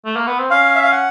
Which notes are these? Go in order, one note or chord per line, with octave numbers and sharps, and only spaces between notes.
A3
A#3
B3
C4
C#4 F5
E5
F5
F#5